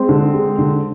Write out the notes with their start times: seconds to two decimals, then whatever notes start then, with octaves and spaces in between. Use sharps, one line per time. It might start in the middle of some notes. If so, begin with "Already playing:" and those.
Already playing: G#3 C4
0.09 D3
0.34 G#3
0.59 D3